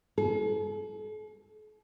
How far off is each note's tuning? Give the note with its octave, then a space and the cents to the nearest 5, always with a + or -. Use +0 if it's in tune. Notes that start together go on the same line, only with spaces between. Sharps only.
A4 -45